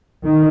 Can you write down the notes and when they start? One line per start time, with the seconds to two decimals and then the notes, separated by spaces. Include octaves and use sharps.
0.25 D#3